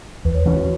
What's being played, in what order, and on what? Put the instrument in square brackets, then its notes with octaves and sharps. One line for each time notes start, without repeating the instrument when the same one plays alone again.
[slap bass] E2 [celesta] B4
[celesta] C#5
[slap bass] E3 C#4 [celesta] B4
[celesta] F#4